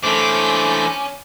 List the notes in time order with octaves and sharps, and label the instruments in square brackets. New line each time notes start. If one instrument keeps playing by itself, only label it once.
[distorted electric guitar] E3 D4 [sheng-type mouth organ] A3 C5 G6 [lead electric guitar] C#4 [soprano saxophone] D6